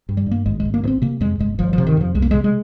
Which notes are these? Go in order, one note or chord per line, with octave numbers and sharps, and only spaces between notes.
G2
G3
G2
A#3
G#1 G#3
G#3
G#1
A#3
G2
C4
C3 A#3
F2 G#3
G1 G#3
G1 F3
F3
C3
D#3
F2 F3
C2 G#3
A#3
C3 G#3
G#3